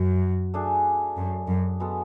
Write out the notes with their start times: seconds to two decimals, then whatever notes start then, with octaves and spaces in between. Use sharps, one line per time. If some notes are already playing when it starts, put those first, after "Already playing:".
Already playing: F#2 F#4
0.54 A3 D4 G#4
1.17 F#2
1.48 F#2
1.80 G#3 B3 F#4 A4